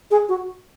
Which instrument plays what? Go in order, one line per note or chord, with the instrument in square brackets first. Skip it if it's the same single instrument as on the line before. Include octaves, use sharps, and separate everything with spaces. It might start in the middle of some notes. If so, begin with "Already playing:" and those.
[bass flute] G#4
F#4